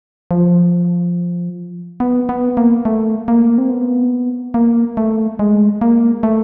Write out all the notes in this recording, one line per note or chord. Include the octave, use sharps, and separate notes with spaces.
F3
B3
B3
A#3
A3
A#3
C4
B3
A#3
A3
G#3
A#3
A3